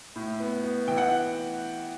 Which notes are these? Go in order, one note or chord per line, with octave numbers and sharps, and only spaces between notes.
A2
B3
B3
E3 G5
F#5